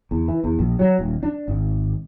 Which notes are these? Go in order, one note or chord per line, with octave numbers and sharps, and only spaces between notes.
E2
E3
E2
A#1
F#3
D#1
D4
G#1